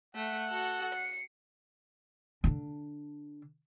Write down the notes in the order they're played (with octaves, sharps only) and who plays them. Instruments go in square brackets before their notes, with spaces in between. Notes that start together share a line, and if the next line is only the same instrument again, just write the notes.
[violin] A3 [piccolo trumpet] F#5
[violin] F#4 A4
C7 C#7
[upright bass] D3 D4